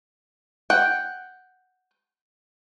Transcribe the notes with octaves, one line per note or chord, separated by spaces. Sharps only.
F#5 G5